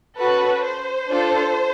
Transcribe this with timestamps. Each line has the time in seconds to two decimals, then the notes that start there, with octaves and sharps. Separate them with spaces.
0.18 C#4 F#4 A4 B4
0.63 C5
1.09 D4 F4 A4